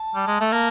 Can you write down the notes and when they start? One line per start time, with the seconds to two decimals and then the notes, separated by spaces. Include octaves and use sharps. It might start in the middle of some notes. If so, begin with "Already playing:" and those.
Already playing: A5
0.15 G3
0.27 G#3
0.41 A3
0.53 A#3 A5